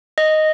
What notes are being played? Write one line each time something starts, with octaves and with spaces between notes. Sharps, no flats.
D#5